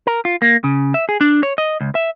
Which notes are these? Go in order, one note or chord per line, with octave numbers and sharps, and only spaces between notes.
A#4
F4
A#3
C#3
E5
G#4
D4
C#5
D#5
C#2
E5